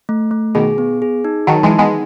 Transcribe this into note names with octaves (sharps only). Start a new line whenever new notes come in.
A3
A3
B2 D#3 G#4
B3
G#4
D#4
D#3 F#3 A5
E3 G#3
D#4
G#3 B3